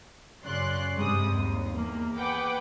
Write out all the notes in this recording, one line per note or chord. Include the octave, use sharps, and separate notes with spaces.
F#2 C#3 C#4 D5 C6 F#6
G2 C3 G3 G#3 D#6
D#2
E2 A#3
G#4 B4 F#5 G5 D6